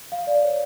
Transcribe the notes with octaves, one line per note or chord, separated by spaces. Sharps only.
F5
D5
C#5